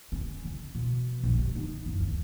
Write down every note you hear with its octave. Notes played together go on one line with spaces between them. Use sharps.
C#4
C#3
B2
A#1
G3
D#4
F#2
D2